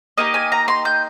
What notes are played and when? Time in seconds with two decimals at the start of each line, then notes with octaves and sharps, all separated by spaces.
0.17 A#3 D#4 G4 D#5
0.34 G#5
0.52 A#5
0.68 C6
0.85 G6